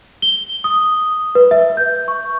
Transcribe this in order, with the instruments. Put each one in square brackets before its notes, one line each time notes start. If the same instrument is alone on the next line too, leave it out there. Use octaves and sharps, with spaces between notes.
[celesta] G7
D#6
B4
E5
G6
C#6